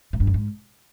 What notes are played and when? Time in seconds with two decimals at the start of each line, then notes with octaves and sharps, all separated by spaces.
0.13 A2
0.20 G2
0.27 F#2
0.34 G#2